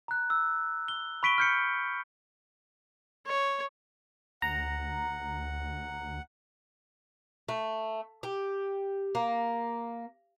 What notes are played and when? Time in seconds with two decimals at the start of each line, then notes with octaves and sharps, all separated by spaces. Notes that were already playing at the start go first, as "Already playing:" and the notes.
0.08 A#5 F#6
0.30 E6
0.88 G7
1.23 B5 C#6 B6 D7 D#7 G7
1.38 F6 G6 C#7
3.26 C#5
4.42 D2 F#5 A#5
7.48 A3
8.23 G4
9.15 A#3